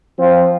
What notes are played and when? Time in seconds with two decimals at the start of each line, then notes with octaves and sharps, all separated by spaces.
0.18 F3 C4 F4